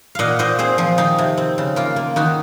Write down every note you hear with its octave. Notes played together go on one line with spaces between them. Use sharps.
A#2 D#5 F5 F#5
A#2 C5 D#5
C4 G#4 C5
F3
D#3 D#4
C3
C4
C#3
A#3 F4
A#3
D#3 D#4 F#4